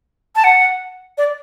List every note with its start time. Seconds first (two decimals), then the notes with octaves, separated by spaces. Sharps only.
0.36 A5
0.44 F#5
1.18 D5